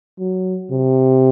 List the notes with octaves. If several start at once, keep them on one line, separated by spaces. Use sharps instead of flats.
F#3
C3